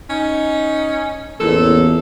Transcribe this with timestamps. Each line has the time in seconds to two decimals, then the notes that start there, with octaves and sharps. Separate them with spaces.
0.10 C#4 D#4
1.40 A1 E2 A#2 A4